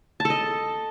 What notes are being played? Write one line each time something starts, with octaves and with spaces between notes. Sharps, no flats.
A5
A4
D#5